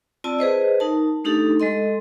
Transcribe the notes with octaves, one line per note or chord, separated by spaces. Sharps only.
C4 F4 D5 A5 E6
G#4 B4 C5 D#5
D#4 A#4 A5
A3 D4 D#4 G4 A4
G#3 A4 D#5 C6